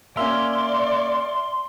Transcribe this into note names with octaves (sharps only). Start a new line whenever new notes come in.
A#3 C#4 D5 E5 C6 F6